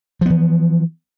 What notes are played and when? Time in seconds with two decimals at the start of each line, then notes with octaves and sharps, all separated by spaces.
0.21 F3
0.26 B3
0.30 E3